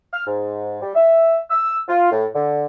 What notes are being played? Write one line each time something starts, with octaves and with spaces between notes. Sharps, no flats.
F6
G#2
G3
E5
E6
F4
A2
D3